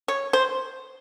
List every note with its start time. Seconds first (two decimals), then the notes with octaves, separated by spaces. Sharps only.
0.08 C#5
0.33 C5